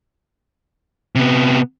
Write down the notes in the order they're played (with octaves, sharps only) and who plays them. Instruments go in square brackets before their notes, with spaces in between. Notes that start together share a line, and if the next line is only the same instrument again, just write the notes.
[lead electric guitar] C3 B3